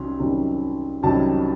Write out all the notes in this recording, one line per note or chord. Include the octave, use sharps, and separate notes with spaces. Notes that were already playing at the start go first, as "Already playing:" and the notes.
Already playing: C2 C3 D#3 F#3 C#4 C6
C2 C3 D#3 F#3 C#4
C2 C3 D#3 F#3 C#4 A5